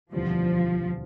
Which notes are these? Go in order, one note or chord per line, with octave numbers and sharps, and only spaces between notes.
E1 D2 C3 E3 F3 G3